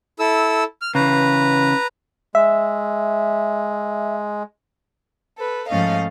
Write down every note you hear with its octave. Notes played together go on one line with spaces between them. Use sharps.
E4 A4 E6
F6
C#3 E3 B4 A#5
G#3 E5
A4 B4
G#2 F3 A3 C#4 D#5 F5